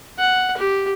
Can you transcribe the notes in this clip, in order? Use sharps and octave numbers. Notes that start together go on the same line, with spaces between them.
F#5
G4